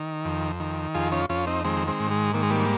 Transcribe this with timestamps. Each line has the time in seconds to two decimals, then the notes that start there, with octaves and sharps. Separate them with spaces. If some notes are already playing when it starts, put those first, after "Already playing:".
Already playing: D#3
0.25 F2
0.60 D#3
0.94 F2 F4 G#4
1.12 C#4 F4
1.29 F2 C#4 F4
1.47 C4 D#4
1.64 D#3 G#3 C4
1.88 G#3 C4
2.00 G#2
2.11 G#3
2.34 D#3 A#3
2.43 G#3
2.50 G3 A#3